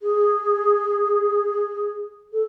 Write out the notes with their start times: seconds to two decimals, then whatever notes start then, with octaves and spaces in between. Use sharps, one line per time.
0.01 G#4
2.33 A4